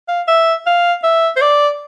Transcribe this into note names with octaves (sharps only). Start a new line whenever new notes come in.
F5
E5
F5
E5
C5
D5